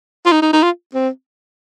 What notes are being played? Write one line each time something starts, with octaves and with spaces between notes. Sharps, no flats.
F4
D#4
D#4
D#4
F4
C4